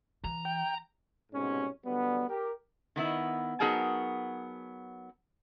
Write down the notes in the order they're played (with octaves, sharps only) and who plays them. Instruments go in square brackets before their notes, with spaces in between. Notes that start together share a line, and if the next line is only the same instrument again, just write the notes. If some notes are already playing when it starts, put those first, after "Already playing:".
[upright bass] E3 [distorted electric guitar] A#5
[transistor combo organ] G5
[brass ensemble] C2 G#2 B2 G3 C#4
D3 F#3 G3 B3
G4 A#4
[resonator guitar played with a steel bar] D#3 B3 E4
F#3 B3 D#4 G#4 A#4 A5